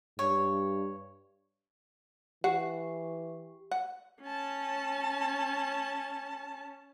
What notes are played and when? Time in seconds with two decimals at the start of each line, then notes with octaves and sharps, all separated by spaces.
0.19 G2 C#5
2.44 E3 G4 F#5
3.71 F#5
4.23 C#4 A5